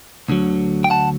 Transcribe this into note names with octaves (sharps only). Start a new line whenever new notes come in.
D2 D3 F#3
G5
F#5 A5